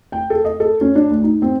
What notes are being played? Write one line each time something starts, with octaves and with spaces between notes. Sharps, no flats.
G5
A4
D#5
A4
C#4
D4
D2
D#4
C4